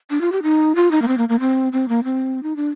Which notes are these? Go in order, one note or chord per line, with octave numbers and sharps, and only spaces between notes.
D4
F4
G4
D#4
F4
D#4
A#3
C4
A#3
A#3
C4
C4
A#3
C4
D#4
D4